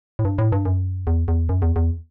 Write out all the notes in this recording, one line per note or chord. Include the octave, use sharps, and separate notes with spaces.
A2
G2
A2
G2
F#2
E2
E2
F#2
E2
E2